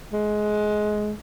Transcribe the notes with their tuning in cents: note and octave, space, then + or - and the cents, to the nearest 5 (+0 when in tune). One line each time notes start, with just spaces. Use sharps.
G#3 +20